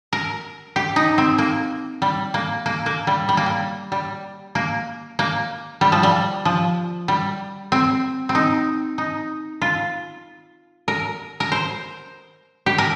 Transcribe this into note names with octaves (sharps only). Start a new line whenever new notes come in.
A#4
G4
D#4
C4
A#3
G3
A#3
A#3
A#3
G3
G3
A#3
G3
G3
A#3
A#3
G3
F3
G3
F3
G3
C4
C4
D#4
D#4
F4
A#4
A#4
C5
G4
A#4